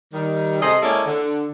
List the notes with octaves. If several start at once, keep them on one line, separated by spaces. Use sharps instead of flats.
D#3 G3
C3 G#4 A4 D#5
G#3 A#3 C#4 E4 A4 D5
D3